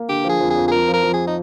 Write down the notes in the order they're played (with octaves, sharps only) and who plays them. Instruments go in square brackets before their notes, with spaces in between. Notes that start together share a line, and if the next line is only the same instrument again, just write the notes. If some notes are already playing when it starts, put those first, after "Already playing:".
Already playing: [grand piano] A#3
[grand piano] D3 [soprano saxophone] G4
[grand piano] F3
[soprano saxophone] G#4
[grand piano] F2
[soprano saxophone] G#4
[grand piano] F2
[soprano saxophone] G#4
[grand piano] F2 [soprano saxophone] A#4
[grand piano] F3
[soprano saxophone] A#4
[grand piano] F3
[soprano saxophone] G#4
D#4